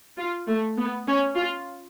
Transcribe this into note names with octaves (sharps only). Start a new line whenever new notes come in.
F4
A3
B3
C#4
F4